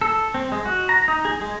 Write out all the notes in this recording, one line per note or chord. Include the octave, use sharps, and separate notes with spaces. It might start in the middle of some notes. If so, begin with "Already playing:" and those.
A4
C4
G#3
F#4
A#5
D#4
G#4
G#3